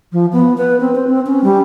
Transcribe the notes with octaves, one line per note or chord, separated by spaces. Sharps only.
F3
B3
B4
C4
C5
C4
C#4
G3